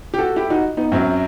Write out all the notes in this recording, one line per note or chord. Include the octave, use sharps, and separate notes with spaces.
G4
F#4 A4
E4 G4
D#4 F#4
B3 D#4
F#2 F#3 C4 E4